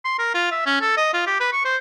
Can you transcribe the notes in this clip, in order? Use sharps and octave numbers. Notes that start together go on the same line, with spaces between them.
C6
A#4
F4
E5
C#4
A4
D#5
F4
G4
B4
C#6
C5